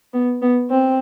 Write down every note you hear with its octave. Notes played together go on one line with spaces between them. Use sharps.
B3
B3
C4